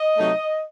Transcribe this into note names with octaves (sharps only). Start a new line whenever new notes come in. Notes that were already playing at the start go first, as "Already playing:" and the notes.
Already playing: D#5
C3 F#3 A3 D#4